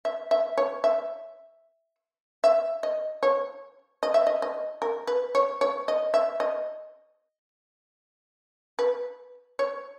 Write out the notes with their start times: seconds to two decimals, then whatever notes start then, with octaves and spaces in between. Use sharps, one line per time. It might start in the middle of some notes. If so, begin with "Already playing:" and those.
0.05 E5
0.31 E5
0.57 C#5
0.84 E5
2.44 E5
2.83 D#5
3.23 C#5
4.03 D#5
4.14 E5
4.27 D#5
4.42 D#5
4.82 A#4
5.07 B4
5.35 C#5
5.61 C#5
5.88 D#5
6.14 E5
6.40 D#5
8.79 B4
9.59 C#5